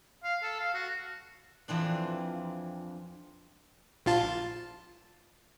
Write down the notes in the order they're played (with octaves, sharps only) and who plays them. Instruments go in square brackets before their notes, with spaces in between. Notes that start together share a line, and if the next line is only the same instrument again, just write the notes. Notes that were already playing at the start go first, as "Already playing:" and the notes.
[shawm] F5
A4
F5
F#4
[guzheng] F2 E3 C4 D4
[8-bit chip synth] A#1 F4 A5